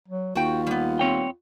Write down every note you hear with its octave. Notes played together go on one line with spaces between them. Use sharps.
F#3
D#2 F4 F#4 G5
G3 B3
C4 C#5 G5